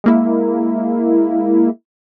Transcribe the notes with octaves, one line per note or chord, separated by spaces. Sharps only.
G#3 A#3 E4